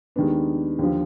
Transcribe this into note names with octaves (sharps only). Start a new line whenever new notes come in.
D#2 D#3 G#3 B3 D4
D#2 D3 F3